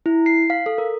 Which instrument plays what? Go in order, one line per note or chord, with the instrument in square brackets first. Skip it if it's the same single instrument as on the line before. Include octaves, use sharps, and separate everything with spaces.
[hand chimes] E4
C7
F5
A4
A#4